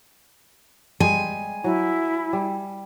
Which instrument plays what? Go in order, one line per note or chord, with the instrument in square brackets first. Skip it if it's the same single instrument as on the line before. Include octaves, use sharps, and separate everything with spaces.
[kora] G3 G#3 G#4 [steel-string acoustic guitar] G#5
[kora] F#3 [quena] E4
[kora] G3